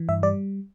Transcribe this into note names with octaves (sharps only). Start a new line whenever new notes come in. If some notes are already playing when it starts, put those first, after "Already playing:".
Already playing: E3
G2 E5
G3 D5